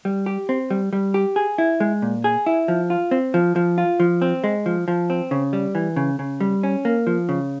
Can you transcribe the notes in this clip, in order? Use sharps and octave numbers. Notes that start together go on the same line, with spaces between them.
G3
G4
C4
G3
G3
G4
G#4
E4
G#3
A#2
G#4
E4
F3
F4
C4
F3
F3
F4
F3
C4
G#3
F3
F3
C4
C#3
G3
E3
C#3
C#3
G3
C#4
A#3
F3
C#3